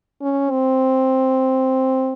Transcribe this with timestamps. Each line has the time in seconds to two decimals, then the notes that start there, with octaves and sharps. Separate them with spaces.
0.21 C#4
0.51 C4